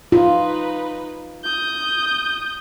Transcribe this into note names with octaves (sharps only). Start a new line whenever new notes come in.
D#4 F4 B4
D#6 G6